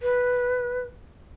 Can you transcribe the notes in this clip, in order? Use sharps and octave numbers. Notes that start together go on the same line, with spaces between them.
B4